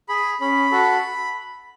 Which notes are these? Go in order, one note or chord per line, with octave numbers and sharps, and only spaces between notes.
G#4 B5
C#4 B5
F#4 A4